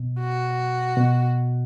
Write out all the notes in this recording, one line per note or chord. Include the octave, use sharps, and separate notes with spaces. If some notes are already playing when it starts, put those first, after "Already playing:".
Already playing: B2
F#4
B2